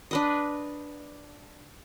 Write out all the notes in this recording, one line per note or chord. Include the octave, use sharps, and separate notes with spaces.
D4 B4 D#5